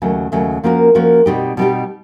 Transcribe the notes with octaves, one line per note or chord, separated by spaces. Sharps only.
D#2 C#3 F#3 A3
D#2 C#3 F#3 A3
F3 A#3 C#4 F#4 A#4
F3 A#3 C#4 F#4 A#4
B2 G3 C4 D#4 G4
B2 G3 C4 D#4 G4